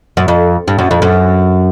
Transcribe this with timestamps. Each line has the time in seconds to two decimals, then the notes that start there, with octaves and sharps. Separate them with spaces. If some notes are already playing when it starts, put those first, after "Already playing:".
0.17 F#2
0.28 F2
0.68 G2
0.79 F#2
0.91 F2
1.02 F#2